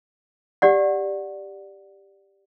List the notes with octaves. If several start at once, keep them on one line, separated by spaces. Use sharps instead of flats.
G4 D5 F#5